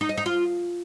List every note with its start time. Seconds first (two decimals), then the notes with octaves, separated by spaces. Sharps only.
0.01 D#4
0.09 D#5
0.17 D#4
0.26 F4